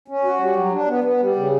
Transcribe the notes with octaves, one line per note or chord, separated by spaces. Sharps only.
C#4
F#4
G3
F#3
D4
B3
B3
G3
C#3